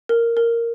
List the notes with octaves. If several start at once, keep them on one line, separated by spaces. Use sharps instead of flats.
A#4
A#4